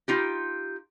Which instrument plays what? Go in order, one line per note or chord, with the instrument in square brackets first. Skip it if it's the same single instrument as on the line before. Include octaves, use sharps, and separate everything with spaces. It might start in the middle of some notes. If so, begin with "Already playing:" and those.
[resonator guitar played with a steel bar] D#4 F4 G4